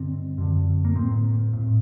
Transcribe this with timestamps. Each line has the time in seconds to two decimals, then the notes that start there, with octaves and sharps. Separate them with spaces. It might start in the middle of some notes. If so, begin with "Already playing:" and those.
Already playing: G2 D3 C4
0.38 F#2 D3
0.85 A#3
0.95 A2 C4
1.53 A2